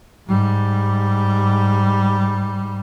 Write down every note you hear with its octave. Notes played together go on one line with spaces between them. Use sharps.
G#2 G3